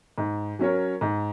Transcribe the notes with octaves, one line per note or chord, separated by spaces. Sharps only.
G#2
F#3 C#4 A#4 C#5
G#2